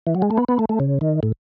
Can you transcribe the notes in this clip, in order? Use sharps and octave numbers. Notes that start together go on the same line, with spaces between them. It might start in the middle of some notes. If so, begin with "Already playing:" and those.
E3
F#3
G#3
A3
B3
B3
A3
A3
C#3
D#3
A2